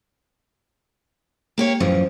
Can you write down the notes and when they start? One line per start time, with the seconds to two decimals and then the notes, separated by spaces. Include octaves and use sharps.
1.58 A#3 G4 C#5
1.80 F#2 A2 E3 F3